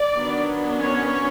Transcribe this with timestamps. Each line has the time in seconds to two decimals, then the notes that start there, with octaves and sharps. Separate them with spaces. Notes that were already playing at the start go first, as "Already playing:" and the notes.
Already playing: D5
0.15 D#3 F#3 B3 D4
0.81 C#4 C#5